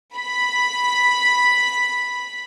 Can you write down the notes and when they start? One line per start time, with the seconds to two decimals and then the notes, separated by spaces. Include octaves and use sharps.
0.16 B5 B6